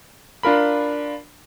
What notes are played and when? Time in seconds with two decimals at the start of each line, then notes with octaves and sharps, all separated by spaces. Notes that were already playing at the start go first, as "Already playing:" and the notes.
0.43 D4 F4 A#4 B5